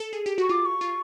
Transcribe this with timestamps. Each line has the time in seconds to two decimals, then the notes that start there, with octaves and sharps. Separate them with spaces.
0.00 A4
0.13 G#4
0.26 G4
0.38 F#4 C#6
0.49 F4 D6
0.65 C#6
0.81 F4